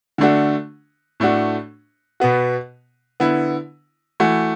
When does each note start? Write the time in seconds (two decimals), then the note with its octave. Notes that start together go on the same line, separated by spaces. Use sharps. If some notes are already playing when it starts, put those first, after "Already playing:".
0.18 D3 A3 D4 F#4
1.20 A2 A3 D4 F#4
2.20 B2 B3 F#4
3.20 D3 B3 E4
4.20 E3 A3 F#4